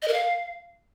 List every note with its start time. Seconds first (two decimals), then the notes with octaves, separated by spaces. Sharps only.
0.02 D#5
0.08 A#4
0.13 F5